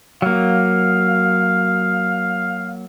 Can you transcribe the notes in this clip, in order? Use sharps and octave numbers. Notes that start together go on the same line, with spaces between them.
F#3 A#3 F5